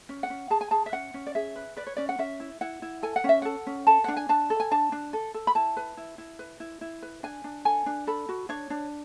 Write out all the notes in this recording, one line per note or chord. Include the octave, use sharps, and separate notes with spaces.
C#4
F#5
C#4
G#4 A5
G#5
G#4 A5
E5
C#4 F#5
C#4
D5
G#4 E5
B4
B4 D5
C#5
C#4 D5
F#5
C#4 E5
E4
E4 F#5
E4
A4 G#5
F#5
C#4 E5
A4 F#5
C#4
A4 A5
D4 F#5
G#5
D4 A5
A4
G#5
D4 A5
D4
A4
A4
B5
E4 A5
B4
E4
E4
B4
E4
E4
B4
D4 G#5
D4
A4 G#5
D4
A4 B5
F#4
D4 C#5
D4